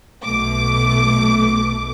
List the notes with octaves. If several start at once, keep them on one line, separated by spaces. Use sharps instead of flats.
B1 B2 A3 D6